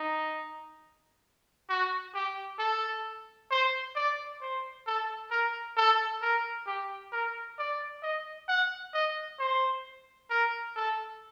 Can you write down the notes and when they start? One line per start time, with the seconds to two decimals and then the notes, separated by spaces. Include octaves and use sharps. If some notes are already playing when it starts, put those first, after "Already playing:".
Already playing: D#4
1.69 F#4
2.14 G4
2.59 A4
3.51 C5
3.96 D5
4.41 C5
4.87 A4
5.31 A#4
5.77 A4
6.22 A#4
6.67 G4
7.12 A#4
7.59 D5
8.03 D#5
8.48 F#5
8.94 D#5
9.39 C5
10.30 A#4
10.76 A4